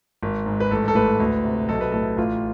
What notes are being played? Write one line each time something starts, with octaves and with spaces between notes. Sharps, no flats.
G#1
G#2
B4
A1 A4
A4
A2 B4
D2
C3
B1 A4
B4
A2 A4
A1 F4